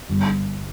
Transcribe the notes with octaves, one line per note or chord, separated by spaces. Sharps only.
G1